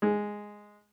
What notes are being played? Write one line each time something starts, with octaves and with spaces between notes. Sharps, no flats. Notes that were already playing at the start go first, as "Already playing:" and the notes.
G#3